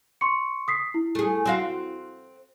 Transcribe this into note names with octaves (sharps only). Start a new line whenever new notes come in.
C6 C#6 C#7
D#6 B6 C7
E4
A3 G#4
C4 F#4 F5